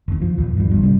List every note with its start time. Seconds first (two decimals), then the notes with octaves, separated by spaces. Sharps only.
0.08 F#1 D#2
0.22 F3
0.38 D#1 D#2
0.57 G2 F3
0.70 G1 G3
0.82 C3 G3 C4 C#4